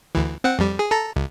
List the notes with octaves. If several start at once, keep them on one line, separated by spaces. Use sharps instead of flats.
D2 E3
C4 F#5
F2 G3
G#4
A4 A5 A#5
C#2